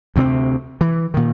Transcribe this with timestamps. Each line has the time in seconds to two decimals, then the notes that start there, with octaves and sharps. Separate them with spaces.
0.16 D2 C3 B3 C4
0.81 E3
1.14 A#2 D#3